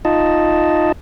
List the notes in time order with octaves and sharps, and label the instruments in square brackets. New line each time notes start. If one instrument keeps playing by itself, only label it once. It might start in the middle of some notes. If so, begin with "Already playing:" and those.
[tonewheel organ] D#4 F4 D#5 A5